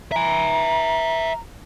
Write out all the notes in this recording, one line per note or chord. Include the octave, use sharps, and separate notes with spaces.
E5 G#5 A#5